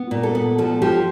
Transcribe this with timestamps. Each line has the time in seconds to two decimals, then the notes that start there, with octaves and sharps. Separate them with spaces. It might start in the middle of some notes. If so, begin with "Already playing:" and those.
Already playing: B3
0.11 A#2
0.23 A4
0.35 B3
0.58 F3 A4
0.82 F3 G4